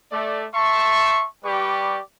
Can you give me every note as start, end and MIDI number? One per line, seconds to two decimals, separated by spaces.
0.11 0.46 57
0.11 0.46 74
0.54 1.26 76
0.54 1.26 81
0.54 1.26 84
0.54 1.26 85
1.45 1.99 55
1.45 1.99 67
1.45 1.99 71
1.45 1.99 74
1.45 1.99 85